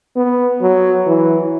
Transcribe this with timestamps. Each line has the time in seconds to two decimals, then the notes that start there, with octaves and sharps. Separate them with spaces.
0.16 B3
0.62 F#3
1.07 E3